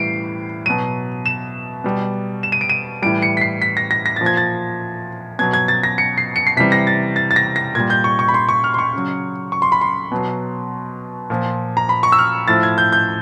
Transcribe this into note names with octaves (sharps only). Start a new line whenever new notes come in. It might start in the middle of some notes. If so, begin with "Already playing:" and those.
Already playing: A2 E3 G3 C7 D7
B2 F#3 D#7
E7
B2 G3
E7
D#7
D7
D#7
A2 E3 G3 D7
C#7
B6
C7
B6
A#6
A#6
A#6
A#2 F3 A6
G#6
A6
B2 F#3 G#6
G#6
A6
A#6
C#7
C7
C#7
C7
C3 E3 G3 B6
A#6
A6
A6
A6
A#6
A#6
A#2 G3 G#6
G6
C#6
C#6
B5
C6
C#6
F6
C6
C#6
C#3 F#3
C#6
C6
B5
C6
B2 F#3
A#2 F3
A#5
B5
C#6
E6
F6
A2 F3 A6
G#6
G6
G6